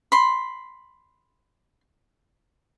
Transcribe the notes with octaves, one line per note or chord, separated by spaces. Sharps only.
B5 C6